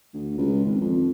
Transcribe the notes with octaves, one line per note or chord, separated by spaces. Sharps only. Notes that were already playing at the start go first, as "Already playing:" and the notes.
D2
C#2
G#1
F2